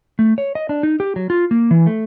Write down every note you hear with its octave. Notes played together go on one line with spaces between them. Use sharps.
A3
C#5
D#5
D4
D#4
G4
F#3
F4
A#3
E3
A3